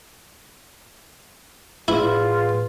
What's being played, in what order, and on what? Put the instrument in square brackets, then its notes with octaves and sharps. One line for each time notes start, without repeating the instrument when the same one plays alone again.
[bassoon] E2 [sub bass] A2 [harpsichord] E4 [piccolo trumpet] F4